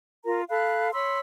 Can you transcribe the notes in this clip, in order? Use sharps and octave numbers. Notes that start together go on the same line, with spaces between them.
F4 A#4 A#5
A4 F5 B5 F#6
C#5 B5 C6 E6